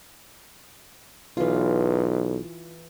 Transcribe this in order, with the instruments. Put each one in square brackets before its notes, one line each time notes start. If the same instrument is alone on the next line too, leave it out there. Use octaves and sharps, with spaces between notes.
[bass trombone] B1 [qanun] E3 F4